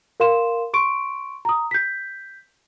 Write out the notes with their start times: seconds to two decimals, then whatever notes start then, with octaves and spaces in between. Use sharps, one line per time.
0.20 A#4 F5 C6 E7
0.74 C6 C#6 D7
1.45 A#5 D#6
1.71 G6 B6